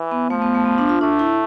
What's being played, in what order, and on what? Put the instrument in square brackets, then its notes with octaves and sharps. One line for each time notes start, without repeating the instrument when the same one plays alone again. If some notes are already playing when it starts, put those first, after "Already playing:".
Already playing: [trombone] E3
[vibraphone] B3
[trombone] F3 [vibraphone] A3
[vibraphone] B3
A3
B3
D4
F4
[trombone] A3 [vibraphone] D4
[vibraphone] E4